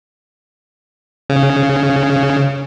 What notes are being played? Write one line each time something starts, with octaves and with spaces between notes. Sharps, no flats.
C#3